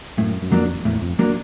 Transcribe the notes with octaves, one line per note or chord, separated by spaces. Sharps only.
F#2 A2
F#2
F2 F#3 A#3 D4
E2 A2
F2
F#3 A#3 D4